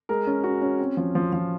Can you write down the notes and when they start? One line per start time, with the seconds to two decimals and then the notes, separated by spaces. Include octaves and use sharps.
0.09 G#3 A#4
0.27 C#4
0.44 C#4 F#4
0.62 C#4
0.80 C4
0.97 F3
1.15 F3
1.33 F3